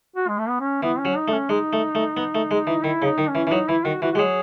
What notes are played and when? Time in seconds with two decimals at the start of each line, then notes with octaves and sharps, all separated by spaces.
0.16 F#4
0.28 G#3
0.38 A3
0.49 B3
0.60 C#4
0.83 E3 B3
0.99 C#4
1.05 F#3
1.16 D#4
1.28 A3
1.33 C#4
1.49 G#3 D#4
1.73 A3
1.95 A3
2.17 B3
2.35 A3
2.51 G#3
2.67 E3
2.84 D#3 E4
3.02 C#3
3.07 D#4
3.18 D#3
3.29 C#4
3.35 E3
3.47 E3
3.51 F#3 D#4
3.69 E3 E4
3.85 D#3 F#4
4.02 E3 F#4
4.12 F#4
4.15 G#3
4.19 F#3 G#4